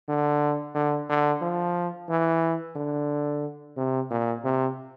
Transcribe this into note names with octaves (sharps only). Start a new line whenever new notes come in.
D3
D3
D3
F3
E3
D3
C3
A#2
C3